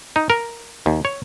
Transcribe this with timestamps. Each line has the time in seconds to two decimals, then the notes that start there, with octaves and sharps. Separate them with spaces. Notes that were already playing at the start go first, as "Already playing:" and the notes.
0.16 D#4
0.30 A#4
0.86 D#2
1.05 C#5